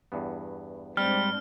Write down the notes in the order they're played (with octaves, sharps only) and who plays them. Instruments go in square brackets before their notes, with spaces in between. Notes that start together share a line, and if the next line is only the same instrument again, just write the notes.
[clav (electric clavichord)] E2 G2 B3
[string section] G#2 C4 D4 [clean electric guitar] G3 [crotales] F6